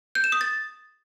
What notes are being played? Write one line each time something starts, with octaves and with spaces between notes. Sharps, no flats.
G6
E7
D#6
A6